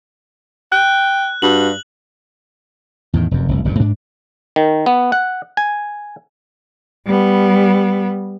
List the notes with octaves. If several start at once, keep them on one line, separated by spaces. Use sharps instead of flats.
G5 F#6
G2 F#4 F#7
E2 A2 D#3
F1 F#2
F1 C2
F#1 D2 A#2
G#2 D4
D#3
B3
F#5
G#5
G3 B3